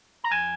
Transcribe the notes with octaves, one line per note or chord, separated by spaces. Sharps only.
A#5
F2 G#5